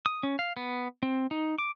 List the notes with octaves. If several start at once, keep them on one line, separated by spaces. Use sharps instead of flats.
D#6
C#4
F5
B3
C4
D#4
D6